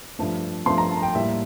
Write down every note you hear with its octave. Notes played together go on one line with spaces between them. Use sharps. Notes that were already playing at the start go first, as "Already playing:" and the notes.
G2 F3 A3
G2 F3 A3 C6
A#5
A5
G5
A2 G3 A#3 E5